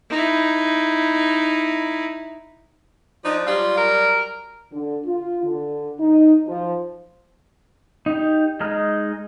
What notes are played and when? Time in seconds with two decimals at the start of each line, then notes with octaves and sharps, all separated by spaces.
0.10 D#4 E4
3.25 F3 D4 D#4
3.47 F#3 G3 F4
3.77 A#4
4.72 D3
5.06 F4
5.43 D3
5.99 D#4
6.48 F3
8.06 D#4 G4
8.60 G#3 D#4 D#5 A#5 F6